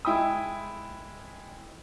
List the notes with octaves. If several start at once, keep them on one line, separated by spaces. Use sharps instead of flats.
G#3 E4 G5 B5 D#6